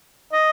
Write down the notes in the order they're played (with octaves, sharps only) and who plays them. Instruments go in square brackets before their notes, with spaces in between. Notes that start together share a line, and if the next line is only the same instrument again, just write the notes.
[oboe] D#5